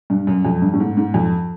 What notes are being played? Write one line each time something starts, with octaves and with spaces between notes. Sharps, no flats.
G2
F#2
F2
G2
A2
G#2
G#2
F2